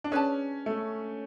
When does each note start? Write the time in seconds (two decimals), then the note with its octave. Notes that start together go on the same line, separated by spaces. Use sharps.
0.04 D4
0.12 C#4 G#4 B4 D5 A5
0.66 A3